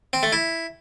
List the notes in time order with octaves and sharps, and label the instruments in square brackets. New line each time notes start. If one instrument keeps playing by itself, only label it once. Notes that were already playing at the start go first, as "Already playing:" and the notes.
[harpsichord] C4
A3
E4